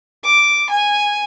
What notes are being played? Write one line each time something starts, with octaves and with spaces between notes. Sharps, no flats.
D6
G#5